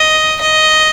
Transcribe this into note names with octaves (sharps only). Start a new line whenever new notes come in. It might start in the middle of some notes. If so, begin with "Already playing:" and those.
Already playing: D#5
D#5